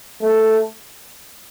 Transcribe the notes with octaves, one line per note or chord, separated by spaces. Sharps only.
A3